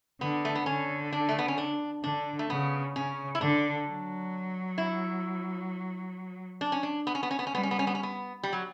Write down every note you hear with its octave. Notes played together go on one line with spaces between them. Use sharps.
D3 B3
A3
B3
D3 C#4
D4
A3
B3
C#4
D4
D3 D4
A3
C#3 B3
C#3 C#4
E4
D3 D4
F#3
E4
D4
C#4
D4
B3
C#4
B3
C#4
B3
C#4
G3 B3
C#4
B3
C#4
B3
C#4
B3
G3
F#3